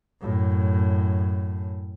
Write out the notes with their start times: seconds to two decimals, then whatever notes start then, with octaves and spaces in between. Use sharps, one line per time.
0.21 F#2 A2